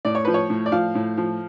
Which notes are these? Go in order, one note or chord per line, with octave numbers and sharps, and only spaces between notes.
A2 D5
C#5
F3 B4
C#5
A2
D5
F3 F5
A2
F3